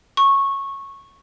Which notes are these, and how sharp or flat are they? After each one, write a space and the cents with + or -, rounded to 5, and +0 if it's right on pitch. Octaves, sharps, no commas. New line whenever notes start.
C#6 -15